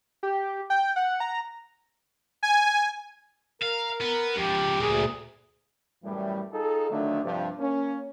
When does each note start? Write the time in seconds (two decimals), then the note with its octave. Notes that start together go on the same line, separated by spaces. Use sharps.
0.23 G4
0.70 G5
0.96 F#5
1.20 A#5
2.43 G#5
3.62 A#4 F5
4.01 B3
4.36 C#2 F3 G4
4.80 D2 A#2 F#3 G#4
6.04 F#2 A2 E3 G3
6.53 D#4 F4 G#4 A4
6.91 D3 D#3 F3 F#3 A3 D4
7.24 G2 C3 F3
7.59 A#3 C#4